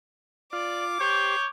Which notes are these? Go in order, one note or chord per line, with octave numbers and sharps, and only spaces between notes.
F4 D5 D6
G4 C5 C#5 G6